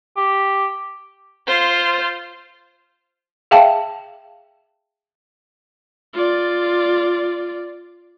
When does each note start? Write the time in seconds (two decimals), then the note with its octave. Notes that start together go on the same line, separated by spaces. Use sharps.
0.17 G4
1.47 F4 C5
3.51 G#4 E5 F5 G5 A5
6.14 F4 D5